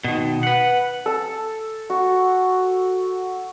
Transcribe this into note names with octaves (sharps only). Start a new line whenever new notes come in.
B2 D#3
B4 F#5
A4 A5
F#4